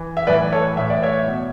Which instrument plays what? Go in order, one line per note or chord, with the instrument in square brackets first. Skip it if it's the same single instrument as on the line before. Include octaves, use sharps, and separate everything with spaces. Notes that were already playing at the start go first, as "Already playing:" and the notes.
Already playing: [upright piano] E3
E5
A2 E3 B4 D5
A4 C#5
A2 E3 E5
D5
C#5 E5
B2